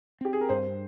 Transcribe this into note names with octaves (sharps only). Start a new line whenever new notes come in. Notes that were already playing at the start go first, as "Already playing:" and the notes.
C4 G4
G#4
A#4
G2 C5